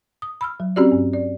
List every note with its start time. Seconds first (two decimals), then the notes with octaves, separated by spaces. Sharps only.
0.22 D#6
0.41 B5 E6 F6
0.60 F#3
0.76 C4 C#4 F#4 G4 D5
0.92 G2
1.13 D5